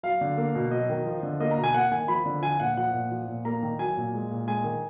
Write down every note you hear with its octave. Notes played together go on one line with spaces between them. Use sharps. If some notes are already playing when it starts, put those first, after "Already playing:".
F#3 F5
D3
A#3
B2
F#3 D#5
D#3
F3
D3
A#3 D#5
A#5
B2
G#5
A#3 F#5
D#3 G#5
F3 B5
D3
F3 G#5
A#2 F#5
F3 F#5
A#2
F3
A#2
A#3 A#5
D#3
F#3 G#5
A#2
G#3
A#2
G#3 G#5
D#3